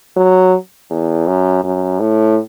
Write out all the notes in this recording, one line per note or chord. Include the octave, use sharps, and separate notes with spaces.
F#3
E2
F#2
F#2
A2